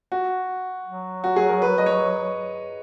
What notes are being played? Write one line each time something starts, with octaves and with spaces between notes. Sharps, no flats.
F#4
F#3
F#4
G#4
A#4
B4
D#5
C#5